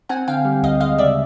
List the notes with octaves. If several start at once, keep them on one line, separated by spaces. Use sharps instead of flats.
C4 F#5 G#5
D3 F5 G5
G3
D2 D#5 F5
G#3 D#5 F5
C#3 D5 E5